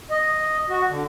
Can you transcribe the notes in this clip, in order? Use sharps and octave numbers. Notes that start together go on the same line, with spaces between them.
D#5
F#4
D3